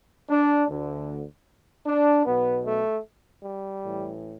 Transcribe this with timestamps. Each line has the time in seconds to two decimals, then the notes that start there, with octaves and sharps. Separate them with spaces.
0.30 D4
0.69 D2 D3
1.86 D4
2.25 B1 B2 B3
2.65 A3
3.44 G3
3.81 A1 A2 E3